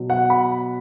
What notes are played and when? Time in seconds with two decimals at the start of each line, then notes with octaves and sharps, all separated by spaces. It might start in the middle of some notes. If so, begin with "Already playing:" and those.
Already playing: B2 F#3
0.10 F#5
0.30 B5